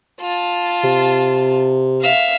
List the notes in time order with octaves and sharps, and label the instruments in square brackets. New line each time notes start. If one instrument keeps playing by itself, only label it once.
[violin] F4 A5
[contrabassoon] C3
[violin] E5 F5